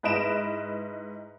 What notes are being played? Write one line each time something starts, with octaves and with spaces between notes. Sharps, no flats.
G#2 E4 B4 D#5 D7 E7